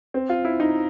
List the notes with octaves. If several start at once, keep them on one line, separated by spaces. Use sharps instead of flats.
C4
F4
E4
D#4